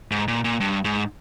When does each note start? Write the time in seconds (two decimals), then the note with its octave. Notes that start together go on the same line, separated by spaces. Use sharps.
0.11 G#2
0.28 A#2
0.44 A#2
0.60 G2
0.85 G#2